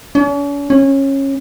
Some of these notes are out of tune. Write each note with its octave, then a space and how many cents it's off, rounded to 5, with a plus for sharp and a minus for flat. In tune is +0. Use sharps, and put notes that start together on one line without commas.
C#4 +45
C#4 -20